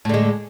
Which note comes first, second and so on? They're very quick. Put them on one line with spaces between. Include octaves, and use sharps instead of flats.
A2 D3 G#3